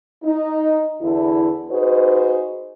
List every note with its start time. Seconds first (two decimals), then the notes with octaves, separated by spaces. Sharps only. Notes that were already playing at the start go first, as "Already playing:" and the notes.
0.24 D#4
1.01 E2 D3 E4
1.70 D#4 F#4 G#4 B4 C5